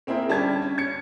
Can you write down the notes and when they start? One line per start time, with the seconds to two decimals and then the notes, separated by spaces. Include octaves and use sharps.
0.07 A#3 C4 E4 G#4 A#4
0.29 D3 G3 C#4 A5 G#6
0.62 C#4
0.78 G#6 C#7